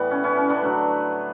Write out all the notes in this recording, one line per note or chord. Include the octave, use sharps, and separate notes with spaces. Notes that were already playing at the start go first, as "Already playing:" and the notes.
Already playing: A2 E3 G3 B3
C#4
C#4 E4
C#4
B3 D4
D3 F#3 A3